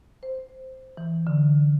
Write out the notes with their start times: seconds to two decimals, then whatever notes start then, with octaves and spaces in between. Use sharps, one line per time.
0.23 C5
0.97 E3
1.27 D3